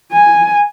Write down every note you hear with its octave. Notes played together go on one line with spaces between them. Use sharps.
G#5